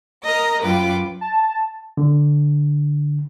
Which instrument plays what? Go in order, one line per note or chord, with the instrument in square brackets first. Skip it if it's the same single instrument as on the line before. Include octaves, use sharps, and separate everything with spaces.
[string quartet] A#4 D#5 A#5 D#6
F#2 F#3 F4 B4 G5 D6
[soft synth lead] A5
[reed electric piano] D3